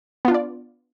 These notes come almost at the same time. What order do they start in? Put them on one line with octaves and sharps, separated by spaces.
B3 F4 D4 D5